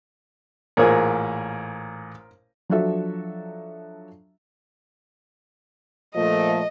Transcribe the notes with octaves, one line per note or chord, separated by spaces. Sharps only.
A1 A#2 G#4 A#4 C5
F3 F#3 D4 F#4 A4 E5
A#2 F3 A3 D#5